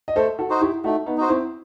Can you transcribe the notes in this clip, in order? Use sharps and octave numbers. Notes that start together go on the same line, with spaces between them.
D#5
A3 A4 C5
F#4 A4
D#4 F#4 C5
E4 G4
A3 D#4 F#4
B3 D#4
D#4 F#4 C5
C4 E4